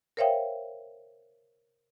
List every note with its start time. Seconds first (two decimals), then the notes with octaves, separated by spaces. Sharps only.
0.17 A#4 C5 C#5 E5 F5 G5